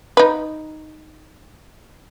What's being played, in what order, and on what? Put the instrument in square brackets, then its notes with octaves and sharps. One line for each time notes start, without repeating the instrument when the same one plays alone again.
[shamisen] D#4 B4